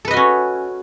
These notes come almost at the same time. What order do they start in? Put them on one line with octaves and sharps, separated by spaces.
A4 B4 D#5 F#4 C#4